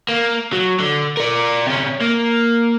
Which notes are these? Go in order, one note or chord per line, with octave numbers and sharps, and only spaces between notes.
A#3
F#3
D3
A#4 D5
C3 C#4
A#3